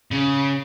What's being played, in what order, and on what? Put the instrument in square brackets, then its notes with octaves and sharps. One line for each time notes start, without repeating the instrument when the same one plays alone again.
[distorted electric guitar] C#3